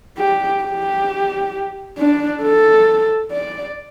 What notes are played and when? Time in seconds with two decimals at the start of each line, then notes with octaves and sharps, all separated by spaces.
0.18 G4
0.63 G4
1.98 D4
2.42 A4
3.32 D5